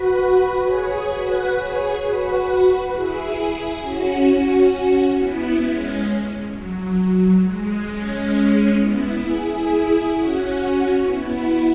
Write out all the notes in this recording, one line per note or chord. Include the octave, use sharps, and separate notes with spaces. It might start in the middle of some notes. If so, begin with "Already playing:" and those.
Already playing: F#4 B4
G#4 C#5
F#4 B4
G#4 C#5
F#4 B4
E4 G#4
C#4 F#4
B3 E4
G#3 C#4
F#3
G#3
G#3 C#4
B3 E4
E4 G#4
C#4 F#4
B3 E4